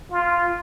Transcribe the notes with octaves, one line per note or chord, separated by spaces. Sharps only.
F4